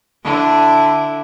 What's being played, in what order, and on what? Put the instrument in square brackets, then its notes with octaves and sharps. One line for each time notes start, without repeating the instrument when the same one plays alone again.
[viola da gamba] D3 D4 E4